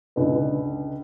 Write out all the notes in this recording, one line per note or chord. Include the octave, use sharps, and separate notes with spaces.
C#2 D3 D#4 B4